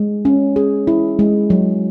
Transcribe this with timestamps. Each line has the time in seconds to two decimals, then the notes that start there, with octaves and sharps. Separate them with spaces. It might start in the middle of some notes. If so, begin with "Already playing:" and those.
Already playing: G#3
0.25 C#4
0.56 G#4
0.87 E4
1.19 G#3
1.50 F#3